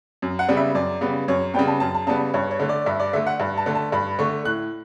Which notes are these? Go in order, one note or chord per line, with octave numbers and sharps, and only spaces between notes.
F#2
F#5
C#3 G3 B3
E5
F#2 D5
C#3 G3 B3
F#2 C#5
C#3 G3 B3 G5
A5
F#2 A5
A5
C#3 G3 B3 A5
G2 C#5
C#5
D3 A3
D5
G2 E5
D5
D3 A3 E5
F#5
G2
A5
D3 A3
A5
G2 B5
D3 A3 C#6
A2 F#6